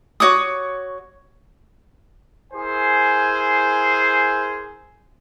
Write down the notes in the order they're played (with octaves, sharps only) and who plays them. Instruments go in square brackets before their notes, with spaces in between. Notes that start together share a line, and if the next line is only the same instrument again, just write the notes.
[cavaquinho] F#4 C#5 D6 D#6
[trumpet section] E4 G#4 A#4 C5 G#5